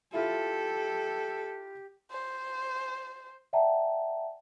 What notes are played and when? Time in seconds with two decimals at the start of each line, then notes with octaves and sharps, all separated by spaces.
0.13 E4 F4 G4 A4
2.12 C5
3.53 D5 E5 F#5 G5 A5 A#5